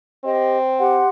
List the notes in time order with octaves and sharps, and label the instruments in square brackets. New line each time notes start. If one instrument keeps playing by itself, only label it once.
[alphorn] C4 [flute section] G4 D#5
[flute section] G4 F#5 C6